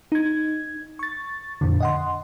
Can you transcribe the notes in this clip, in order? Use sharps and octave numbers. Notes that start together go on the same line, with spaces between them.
D#4 G#6
C#6 A6
F2 A#2 D3
D#5 F#5 C6